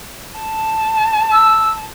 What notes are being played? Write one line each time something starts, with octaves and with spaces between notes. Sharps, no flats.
A5
E6